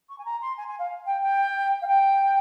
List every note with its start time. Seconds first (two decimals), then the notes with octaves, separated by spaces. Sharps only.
0.09 C#6
0.18 G#5
0.25 A#5
0.41 C6
0.57 G#5
0.68 G#5
0.79 F5
1.06 G5
1.22 G5
1.81 F5
1.87 G5